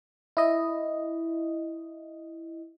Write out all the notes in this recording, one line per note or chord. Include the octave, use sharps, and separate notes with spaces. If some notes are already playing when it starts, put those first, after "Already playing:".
E4 D#5